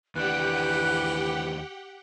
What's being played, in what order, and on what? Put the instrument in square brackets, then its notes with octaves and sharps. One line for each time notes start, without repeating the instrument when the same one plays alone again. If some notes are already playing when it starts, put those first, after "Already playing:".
[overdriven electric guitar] D#2 D4 [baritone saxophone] E3 [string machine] G4 F#5 G5 [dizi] F#6